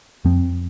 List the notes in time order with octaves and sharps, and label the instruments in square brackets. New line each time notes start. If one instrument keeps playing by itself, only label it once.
[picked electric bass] F2 F3 C4